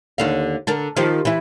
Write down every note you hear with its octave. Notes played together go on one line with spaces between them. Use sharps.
D#2 D3 F5
D3 A4 A#4
D#3 F3 G4
E3 E4